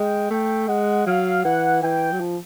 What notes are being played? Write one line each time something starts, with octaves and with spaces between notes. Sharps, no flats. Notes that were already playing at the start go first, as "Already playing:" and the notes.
Already playing: G#3 G5
A3 G5
G#3 F#5
F#3 F5
E3 F#5
E3 G5
F#3
F3